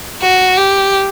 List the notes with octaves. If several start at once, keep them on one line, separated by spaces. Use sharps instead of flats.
F#4
G4